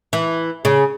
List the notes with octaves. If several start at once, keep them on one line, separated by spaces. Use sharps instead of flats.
E3
C#3